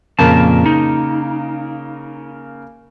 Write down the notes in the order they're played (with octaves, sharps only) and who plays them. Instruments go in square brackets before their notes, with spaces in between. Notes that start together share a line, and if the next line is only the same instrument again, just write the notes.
[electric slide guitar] F2 A#2 A5 [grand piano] C#3 A#3 A#4
[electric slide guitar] D#4